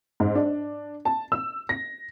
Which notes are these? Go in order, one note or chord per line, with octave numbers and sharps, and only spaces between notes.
G#2
D4
A5
E6
A#6